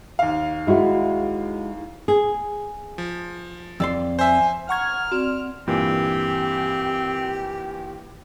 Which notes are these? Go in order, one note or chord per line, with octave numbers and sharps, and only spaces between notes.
D#2 F5
G#3 E4 F#4
G#4
F3
F2 D5 C6 E6
C5 E5 G#5
F#5 A#5 C#6 F6 G#6
C4 F#4 D5
G2 A#2 E3 C4 G4